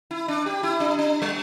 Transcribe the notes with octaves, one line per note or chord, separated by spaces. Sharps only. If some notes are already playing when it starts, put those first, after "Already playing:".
E4
D4
G4
E4
D4
D4
G3